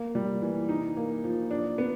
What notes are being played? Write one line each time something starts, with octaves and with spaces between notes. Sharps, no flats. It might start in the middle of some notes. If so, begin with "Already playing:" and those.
Already playing: A#3
G3
E3
D#4
A#3
F3
D4
B3